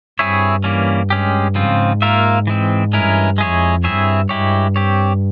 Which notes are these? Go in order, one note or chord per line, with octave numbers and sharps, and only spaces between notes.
G2 C4 E4 G#4 C#5 E5
E3 G3 A#3 C#4
G#3 C#4 G4
G#2 C#3 F3 C4 F4
A#3 F4 A#4 E5
E3 G#3 C4
G2 E3 G#3 C#4 E4 A#4
F2 G#3 E4 G#4 C#5
G2 C4 E4 G#4 C#5 E5
G2 G#3 E4 G4 C#5
C4 G4 C#5